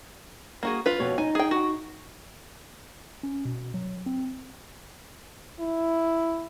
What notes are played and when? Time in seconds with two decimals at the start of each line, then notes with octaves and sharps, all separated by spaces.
0.63 A#3 F#4 G#4
0.86 F4 B4
1.00 F2 B2 C#5
1.18 D#4 G#5
1.35 G#4 G5
1.51 F#4
3.23 C#4
3.45 B2
3.74 F#3
4.06 C4
5.60 E4